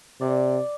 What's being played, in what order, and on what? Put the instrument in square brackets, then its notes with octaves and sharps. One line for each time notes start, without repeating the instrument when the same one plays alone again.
[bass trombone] C3 [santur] D5